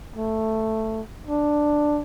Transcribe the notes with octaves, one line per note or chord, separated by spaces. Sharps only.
A3
D4